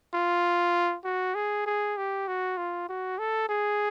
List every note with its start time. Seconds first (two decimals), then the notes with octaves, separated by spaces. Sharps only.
0.14 F4
1.05 F#4
1.35 G#4
1.66 G#4
1.97 G4
2.28 F#4
2.58 F4
2.89 F#4
3.19 A4
3.49 G#4